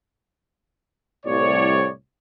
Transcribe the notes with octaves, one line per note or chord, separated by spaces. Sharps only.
C2 A2 C#5 D5